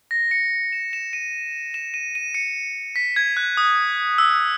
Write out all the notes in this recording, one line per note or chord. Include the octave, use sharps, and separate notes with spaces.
A#6
C#7
E7
E7
D#7
E7
D#7
D#7
C#7
B6
G#6
F#6
D#6
E6